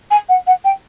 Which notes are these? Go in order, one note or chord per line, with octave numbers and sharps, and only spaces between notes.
G#5
F#5
F#5
G5